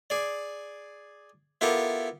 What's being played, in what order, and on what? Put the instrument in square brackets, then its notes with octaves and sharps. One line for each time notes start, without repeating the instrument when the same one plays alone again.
[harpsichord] G#4 D5
B3 E4 F4 G4 A4 A#4